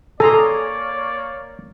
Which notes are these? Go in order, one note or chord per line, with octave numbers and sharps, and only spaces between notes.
A#3 G#4 A4 C#5 D5 A#5 C6